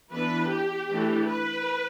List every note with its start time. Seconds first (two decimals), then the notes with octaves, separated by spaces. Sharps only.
0.13 E3 B3 D4 B4
0.52 G4
0.90 E3 A3 D4
1.29 B4